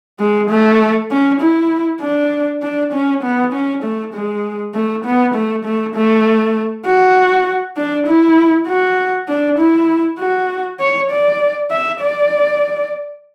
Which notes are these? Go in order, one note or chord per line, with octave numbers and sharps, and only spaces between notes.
G#3
A3
C#4
E4
D4
D4
C#4
B3
C#4
A3
G#3
A3
B3
A3
A3
A3
F#4
D4
E4
F#4
D4
E4
F#4
C#5
D5
E5
D5